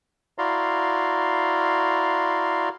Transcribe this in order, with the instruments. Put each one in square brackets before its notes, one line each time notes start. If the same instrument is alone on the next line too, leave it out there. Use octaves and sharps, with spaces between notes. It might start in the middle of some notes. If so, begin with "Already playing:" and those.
[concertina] E4 F#4 D5 F5 A#5 C6